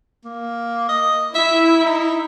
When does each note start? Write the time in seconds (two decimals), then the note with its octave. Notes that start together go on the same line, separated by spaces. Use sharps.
0.24 A#3
0.89 D#5
1.35 E4 E5
1.86 D#4